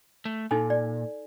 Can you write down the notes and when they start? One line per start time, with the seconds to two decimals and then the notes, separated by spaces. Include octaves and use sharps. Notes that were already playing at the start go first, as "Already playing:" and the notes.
0.25 A3
0.51 A#2 D#4 A4 G#5
0.70 D5